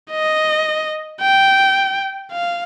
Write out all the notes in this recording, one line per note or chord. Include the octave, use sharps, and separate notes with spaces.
D#5
G5
F5